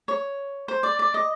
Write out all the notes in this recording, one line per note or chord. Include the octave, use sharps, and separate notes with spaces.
C#5
C5
D5
D5
D#5